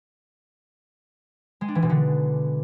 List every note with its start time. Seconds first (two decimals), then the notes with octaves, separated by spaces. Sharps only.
1.61 G#3
1.68 D4
1.75 E3
1.82 B2
1.90 D3